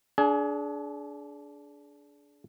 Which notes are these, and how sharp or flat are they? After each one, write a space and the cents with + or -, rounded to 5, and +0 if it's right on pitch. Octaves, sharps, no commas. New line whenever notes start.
D4 -20 G#4 +25 G#5 +25